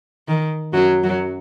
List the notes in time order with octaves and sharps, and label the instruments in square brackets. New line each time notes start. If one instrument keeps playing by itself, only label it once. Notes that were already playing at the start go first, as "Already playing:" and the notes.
[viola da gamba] D#3
F#2 F#3
F#2 F#3